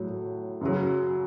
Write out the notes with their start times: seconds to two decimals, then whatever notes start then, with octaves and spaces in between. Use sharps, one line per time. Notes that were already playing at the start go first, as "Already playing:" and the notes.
Already playing: A2 F#3
0.61 F#2 C#3 F#3